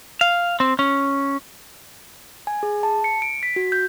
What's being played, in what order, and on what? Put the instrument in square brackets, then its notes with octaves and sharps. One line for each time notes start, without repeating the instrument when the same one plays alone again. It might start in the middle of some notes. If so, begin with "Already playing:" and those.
[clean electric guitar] F5
C4
C#4
[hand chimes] G#5
G#4
A5
C#7
D7
B6
F#4
G6